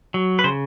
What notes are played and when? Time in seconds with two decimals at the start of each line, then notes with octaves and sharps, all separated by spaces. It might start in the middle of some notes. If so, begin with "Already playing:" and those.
0.14 F#3
0.39 B4
0.44 C#3 C5